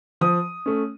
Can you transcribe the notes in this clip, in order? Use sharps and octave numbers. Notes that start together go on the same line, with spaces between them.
F3 D#6
A3 C#4